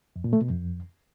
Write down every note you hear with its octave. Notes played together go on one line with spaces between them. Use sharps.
F2
A#2
A3
B2
F2